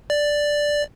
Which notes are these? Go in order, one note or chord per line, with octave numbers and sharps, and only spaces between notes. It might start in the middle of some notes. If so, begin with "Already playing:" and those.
D5